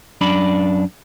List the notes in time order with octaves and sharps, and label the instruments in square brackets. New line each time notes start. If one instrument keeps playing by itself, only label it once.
[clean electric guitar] F#2 D4 D5 B5